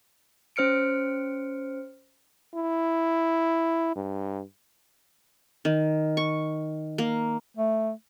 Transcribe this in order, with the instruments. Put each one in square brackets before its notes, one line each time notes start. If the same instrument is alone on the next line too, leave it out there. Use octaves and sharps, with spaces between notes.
[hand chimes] C#4 C5 F6 C#7 D7
[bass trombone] E4
G2
[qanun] D#3
C#6
A#3
[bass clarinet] A3